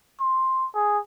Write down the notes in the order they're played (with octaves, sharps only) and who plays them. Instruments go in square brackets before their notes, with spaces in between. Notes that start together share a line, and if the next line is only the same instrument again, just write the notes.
[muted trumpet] C6
G#4